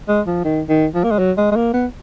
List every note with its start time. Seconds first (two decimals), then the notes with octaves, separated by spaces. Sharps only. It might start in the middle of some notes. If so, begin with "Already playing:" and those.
0.09 G#3
0.27 F3
0.44 D#3
0.69 D#3
0.94 F3
1.04 A#3
1.11 G#3
1.19 F#3
1.37 G#3
1.52 G#3
1.56 A#3
1.74 B3